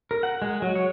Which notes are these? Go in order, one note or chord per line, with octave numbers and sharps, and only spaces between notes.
A#4
F#5
G#3
F#3
C#5